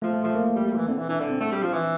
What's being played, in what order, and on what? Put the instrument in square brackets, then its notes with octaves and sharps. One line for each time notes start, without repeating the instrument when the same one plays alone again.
[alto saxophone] F3 [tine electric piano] A3
[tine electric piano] A3
[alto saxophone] F3 [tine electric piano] A3
[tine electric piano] A#3
[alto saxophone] F3
G3
G3
F3
E3
[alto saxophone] D3 [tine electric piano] C4
[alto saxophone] E3
[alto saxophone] E3 [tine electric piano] D4
[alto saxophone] D3 [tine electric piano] E4
[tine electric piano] C4
[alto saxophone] A3
G3
F3
E3